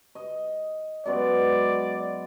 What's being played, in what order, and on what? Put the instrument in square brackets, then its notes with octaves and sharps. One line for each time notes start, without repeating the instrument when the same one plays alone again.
[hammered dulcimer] D#5
[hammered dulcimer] F#2 G#3 B3 [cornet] D5